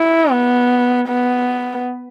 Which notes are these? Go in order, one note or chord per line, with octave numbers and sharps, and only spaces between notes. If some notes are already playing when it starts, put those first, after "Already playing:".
Already playing: E4
B3
B3